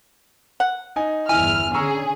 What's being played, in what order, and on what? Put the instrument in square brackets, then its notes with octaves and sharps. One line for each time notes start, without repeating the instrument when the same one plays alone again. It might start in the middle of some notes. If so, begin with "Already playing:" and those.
[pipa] F#5
[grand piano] D#4 G#5
[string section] G1 E2 F6 [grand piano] E4 [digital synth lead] G#5
[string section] D3 C#4 G#4 [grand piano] A#5 C#6 E6